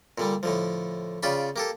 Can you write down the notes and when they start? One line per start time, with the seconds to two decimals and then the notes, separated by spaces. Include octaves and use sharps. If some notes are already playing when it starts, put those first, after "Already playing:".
0.18 A#2 D3 G3
0.43 A2 D3 F3
1.23 C#3 F4 D5 G5 B5
1.56 A#3 G4 A4